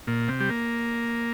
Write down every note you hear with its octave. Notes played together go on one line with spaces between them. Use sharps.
A#2
C3
G3
A#3